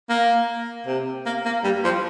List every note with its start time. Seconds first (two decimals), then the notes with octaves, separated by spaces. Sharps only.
0.10 A#3
0.87 C3
1.26 A#3
1.45 A#3
1.64 G3
1.84 F3